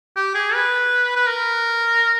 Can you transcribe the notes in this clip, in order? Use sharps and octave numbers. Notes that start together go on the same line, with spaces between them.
G4
G#4
B4
B4
A#4